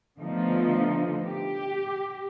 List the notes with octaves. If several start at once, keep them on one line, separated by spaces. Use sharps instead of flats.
D3 F3 A3 B3 D#4
G4